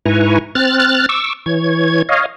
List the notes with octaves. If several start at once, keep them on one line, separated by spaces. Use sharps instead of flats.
G#2 E4 B4 G#5 A#5 C#6
C4 F6 F#6 A6
C#6 D6 E6
E3 C#5 G#6
C#5 D#5 F5